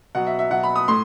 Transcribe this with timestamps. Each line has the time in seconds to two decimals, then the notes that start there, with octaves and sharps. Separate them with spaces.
0.15 B2 F#3 F#5
0.27 E5
0.39 E5
0.51 B2 F#3 F#5
0.63 B5
0.76 D#6
0.88 A2 C6